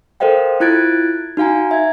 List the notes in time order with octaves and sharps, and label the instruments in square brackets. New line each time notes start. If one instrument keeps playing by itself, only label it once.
[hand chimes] A4 A#4 C5 D#5 F5 G5
E4 F4 F#6 G#6 A6 D7
D#4 F#4 F5 G#5 A#5
E5 G#6